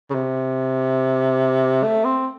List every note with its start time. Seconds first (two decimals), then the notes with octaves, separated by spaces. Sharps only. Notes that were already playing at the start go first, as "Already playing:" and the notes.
0.10 C#3
0.14 C3
1.83 A3
2.05 C4